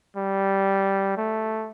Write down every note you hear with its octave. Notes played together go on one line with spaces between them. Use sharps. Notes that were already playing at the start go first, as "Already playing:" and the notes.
G3
A3